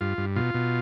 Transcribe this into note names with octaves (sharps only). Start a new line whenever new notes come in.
G2 F4
G2
B2 F4
B2